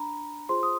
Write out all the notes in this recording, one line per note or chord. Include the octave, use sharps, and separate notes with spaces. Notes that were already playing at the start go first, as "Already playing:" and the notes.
Already playing: D4 A#5 B5
F4 G#4 C5 C6
D#6